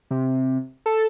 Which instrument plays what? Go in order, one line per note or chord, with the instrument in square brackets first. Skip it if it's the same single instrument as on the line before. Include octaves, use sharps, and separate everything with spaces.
[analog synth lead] C3
A4